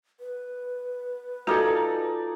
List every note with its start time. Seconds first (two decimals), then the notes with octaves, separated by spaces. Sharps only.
0.20 B4
1.47 D#4 F4 F#4 A4 D5 G#5